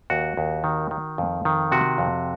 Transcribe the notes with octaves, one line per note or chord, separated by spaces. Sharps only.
D#2 F#4
D#2
D#3
D#3
F2
D#3
C3 F#4
F2